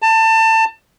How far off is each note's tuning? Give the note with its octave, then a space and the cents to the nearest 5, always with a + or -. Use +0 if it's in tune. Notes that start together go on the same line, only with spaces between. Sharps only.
A5 +25